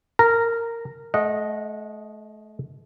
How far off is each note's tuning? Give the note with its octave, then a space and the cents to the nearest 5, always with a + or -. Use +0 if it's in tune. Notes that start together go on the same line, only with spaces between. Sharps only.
A#4 -15 A#5 -5
A3 -35 D#5 +0 F#5 -20